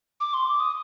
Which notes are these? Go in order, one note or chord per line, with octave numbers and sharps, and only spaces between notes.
D6
C6
D6
D#6